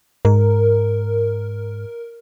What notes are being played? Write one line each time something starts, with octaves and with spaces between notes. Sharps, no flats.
G#2 A#4